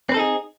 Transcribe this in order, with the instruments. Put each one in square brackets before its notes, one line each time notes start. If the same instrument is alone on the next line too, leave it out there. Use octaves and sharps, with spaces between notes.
[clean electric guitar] C4
B4
A4
D#4
G#4